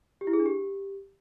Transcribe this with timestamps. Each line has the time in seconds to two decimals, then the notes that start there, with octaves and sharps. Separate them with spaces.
0.21 G4
0.27 E4
0.33 G#4
0.40 D4
0.46 G4